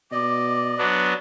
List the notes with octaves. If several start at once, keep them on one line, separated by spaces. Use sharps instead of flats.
B2 D5 D#5 D6
F#3 B3 D4